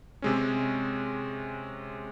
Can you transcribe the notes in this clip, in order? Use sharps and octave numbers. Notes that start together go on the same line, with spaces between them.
C3 G#3 C#4